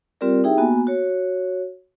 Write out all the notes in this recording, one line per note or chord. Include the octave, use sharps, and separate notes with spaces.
G3 C4 F4 G4 A#4 D5
D#4 E4 G4 G#4 E5 G5
A#3 B3 F#4 G#5
F#4 C#5